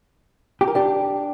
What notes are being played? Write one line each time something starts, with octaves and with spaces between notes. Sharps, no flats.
G4
A#4
D4 G4